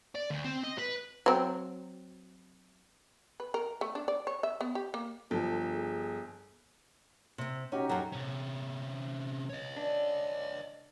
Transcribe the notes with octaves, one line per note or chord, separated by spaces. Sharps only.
D5
D2
C4
D#5
B4
F#3 C4
B4
A#4
A3
D4
D5
C#5
E5
B3
G4
A#3
G1 F3 A4
G#4
C3 C4
C#4 D#4 F#4 G4
F#2 F#3 A4 A#5
C3 C#4
C#5 D#5
D4